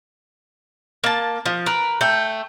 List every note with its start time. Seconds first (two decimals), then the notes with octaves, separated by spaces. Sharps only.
1.04 A#3 A5
1.46 F3
1.66 A#4 B4
2.01 A3 G5